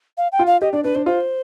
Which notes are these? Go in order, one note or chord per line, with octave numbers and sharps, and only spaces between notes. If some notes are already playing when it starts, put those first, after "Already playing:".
F5
G5
F4
F5
G4 D#5
D4 D5
D4 B4
D4 C5
F4 C5